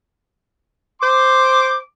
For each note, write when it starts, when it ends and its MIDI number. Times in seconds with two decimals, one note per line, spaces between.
1.01 1.76 72
1.01 1.76 84
1.01 1.81 86